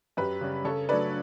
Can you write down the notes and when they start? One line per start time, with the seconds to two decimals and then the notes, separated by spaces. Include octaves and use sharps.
0.17 F#2 G4 B4
0.41 C#3 G3 C#4
0.65 C#3 A4 C#5
0.89 F#3 A3 D4 B4 D5